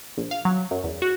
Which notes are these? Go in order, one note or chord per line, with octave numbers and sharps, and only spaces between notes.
A#1
F5
F#3
F#2
E2
F#4